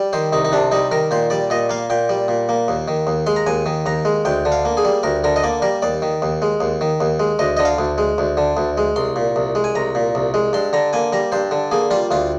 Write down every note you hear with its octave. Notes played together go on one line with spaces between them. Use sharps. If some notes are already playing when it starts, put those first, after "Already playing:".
Already playing: G3
D#3 C5
C2 D#4
D#4
C3 D4
G3 D#4
D#3 A#4
A#2 C5
G3 D5
A#2 D#5
A#3 F5
A#2 G5
G3
A#2
A#3
D#2
D#3
D#2
G#3 C6
A#5
D#2 G#5
D#3
D#2 A#5
G#3
D2 G5
D3
F5
A#3
G#4
G3
D2 A#4
D3 A#4
D#5
A#3 D5
G3 A#4
D#2 D5
D#3
D#2
G#3
D#2
D#3
D#2
G#3
D2 D#5
D3 D#5
F5
D2
G#3
D2
D3
D2
G#3
C2 C6
A#2
C2
G#3
G#5
C2 A#5
A#2
C2
G#3
G2 C6
D3 A#5
A#3 G#5
G3 A#5
G2 C5
D3
A#3 G#4
G3 F4
D2 F4